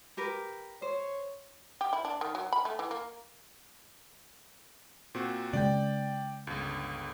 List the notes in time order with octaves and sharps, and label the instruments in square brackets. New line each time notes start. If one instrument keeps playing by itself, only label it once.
[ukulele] G4 A#4 B4
[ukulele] C5 [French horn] C#5
[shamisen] G4
E4
D4
D#3
F#3
B5
A3
E3
A#3
[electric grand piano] A#2 C4 F#4
[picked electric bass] C#3 G#3 [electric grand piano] D5 G5
[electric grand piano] G1 C#2